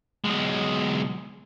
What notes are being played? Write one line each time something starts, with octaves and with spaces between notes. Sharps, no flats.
B1 G#3